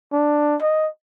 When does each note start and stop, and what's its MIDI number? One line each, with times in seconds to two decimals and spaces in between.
0.13 0.56 62
0.62 0.88 75